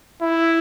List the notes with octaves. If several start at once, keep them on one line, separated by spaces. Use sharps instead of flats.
E4